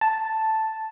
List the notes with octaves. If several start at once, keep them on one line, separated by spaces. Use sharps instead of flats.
A5